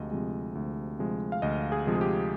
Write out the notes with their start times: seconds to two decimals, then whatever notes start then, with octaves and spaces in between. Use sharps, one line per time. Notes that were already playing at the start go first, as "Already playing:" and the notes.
Already playing: D2 C3 F3 G#3 D#5
0.11 C3 F3 G#3
0.55 D2
0.99 C3 F3 G#3
1.32 F5
1.42 D2 D#5
1.72 G#4
1.87 C3 F3 G#3
1.95 G#4
2.01 G4